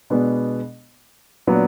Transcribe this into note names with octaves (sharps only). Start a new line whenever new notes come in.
B2 G#3 B3 D4
A#2 F#3 B3 D4